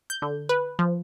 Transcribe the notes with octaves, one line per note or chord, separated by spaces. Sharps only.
G6
D3
B4
F3